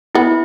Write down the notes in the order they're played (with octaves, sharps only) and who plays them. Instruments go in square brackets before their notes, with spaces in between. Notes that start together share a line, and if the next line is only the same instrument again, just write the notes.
[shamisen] B3 [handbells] E4